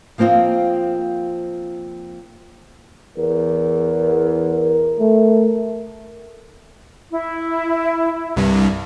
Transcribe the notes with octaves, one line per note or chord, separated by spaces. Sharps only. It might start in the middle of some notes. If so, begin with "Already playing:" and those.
F3 A#3 C4 F4 D#5
E2 A#4
A3
E4
C2 G2